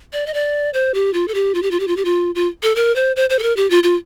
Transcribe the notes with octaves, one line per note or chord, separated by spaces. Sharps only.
D5
D#5
D5
C5
G4
F4
A4
G4
F4
G4
F4
G4
F4
G4
F4
F4
A4
A#4
C5
C5
C5
A4
A#4
G4
F4
F4